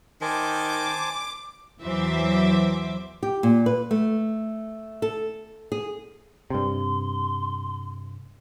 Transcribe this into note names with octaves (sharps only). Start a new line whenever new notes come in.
D#3 C5 G#5 A5 D6
E2 E3 F#3 C5 E5 D6
G4
A#2
B4
A3
A4
G#4
G2 C3 C6